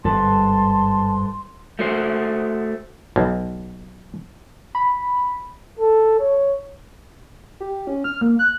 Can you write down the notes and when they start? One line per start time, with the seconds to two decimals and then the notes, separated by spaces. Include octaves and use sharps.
0.04 G1 G#2 G3 A4 B4 A5 C6
1.79 A3 F#4 C5
3.16 B1
4.75 B5
5.79 A4
6.19 C#5
7.60 G4
7.87 C#4
8.04 F6
8.21 A#3
8.39 F#6